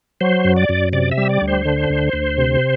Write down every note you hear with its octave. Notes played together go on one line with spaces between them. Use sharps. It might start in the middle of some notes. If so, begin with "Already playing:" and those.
F#3 C5
F#2
D5
F#2
C3 D5
E5
G3
D5
D2
C5
D3
D2
D2
C3